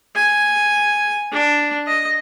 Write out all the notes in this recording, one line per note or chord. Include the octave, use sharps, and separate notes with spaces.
G#5
D4
D#5